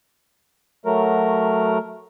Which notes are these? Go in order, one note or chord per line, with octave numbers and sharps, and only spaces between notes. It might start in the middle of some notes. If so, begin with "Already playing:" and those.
F#3 A3 A#4